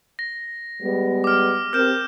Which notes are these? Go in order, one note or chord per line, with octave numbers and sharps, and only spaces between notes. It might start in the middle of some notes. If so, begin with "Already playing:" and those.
A#6
G3 G#3 B3
D6 F6
C4 G4 A#4 F6 G6 E7